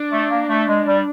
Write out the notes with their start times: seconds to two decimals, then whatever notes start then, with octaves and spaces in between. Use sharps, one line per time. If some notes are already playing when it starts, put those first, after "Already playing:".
Already playing: D4
0.12 A3
0.30 A#3
0.49 A3
0.68 G#3
0.86 G3